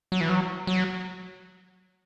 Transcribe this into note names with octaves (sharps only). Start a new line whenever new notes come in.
F#3
E3
F#3
F#3